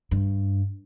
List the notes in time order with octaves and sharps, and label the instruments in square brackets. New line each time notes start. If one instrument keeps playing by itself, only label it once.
[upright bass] G2